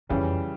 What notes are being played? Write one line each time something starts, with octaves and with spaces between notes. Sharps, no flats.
F2 C#3 E3 G3